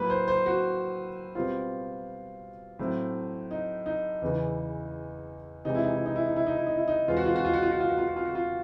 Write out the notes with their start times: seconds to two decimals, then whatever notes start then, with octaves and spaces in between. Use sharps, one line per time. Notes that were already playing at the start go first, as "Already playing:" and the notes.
Already playing: A2 F#3 A#3 B4
0.10 C5
0.28 C5
0.46 F#4
1.35 B2 G3 C4 F4
2.79 A2 F#3 A3 C4
3.51 D#4
3.86 D#4
4.22 E2 C#3 E3
5.65 C3 E3 G#3 D#4
5.75 E4
5.85 D#4
5.95 E4
6.06 D#4
6.16 E4
6.27 D#4
6.36 E4
6.46 D#4
6.57 E4
6.67 D#4
6.77 E4
6.88 D#4
7.08 E2 B2 G#3 C4 F4
7.17 F#4
7.26 F4
7.36 F#4
7.45 F4
7.53 F#4
7.63 F4
7.71 F#4
7.80 F4
7.89 F#4
7.98 F4
8.07 F#4
8.17 F4
8.25 F#4
8.35 F4